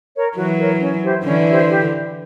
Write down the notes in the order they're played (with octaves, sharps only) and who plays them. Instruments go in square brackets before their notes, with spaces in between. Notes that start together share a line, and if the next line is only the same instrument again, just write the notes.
[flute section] A#4 C#5
[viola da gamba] E3 F#3 [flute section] F#4
[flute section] A#4 C#5
C#4
E4 G4 C5
[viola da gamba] D3 E3 [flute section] C#4
[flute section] E4 G4 C5
G4